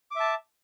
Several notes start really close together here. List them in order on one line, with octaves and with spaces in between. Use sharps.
D6 E5 A5